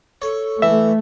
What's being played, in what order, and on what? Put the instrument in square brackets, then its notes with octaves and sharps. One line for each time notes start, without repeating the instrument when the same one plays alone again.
[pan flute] A4 [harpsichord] C#5
[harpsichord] E3 [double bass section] A3 [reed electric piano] E5